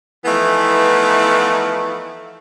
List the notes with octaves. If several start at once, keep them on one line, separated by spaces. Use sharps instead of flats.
E3 F3 A3 B3 D#4 E4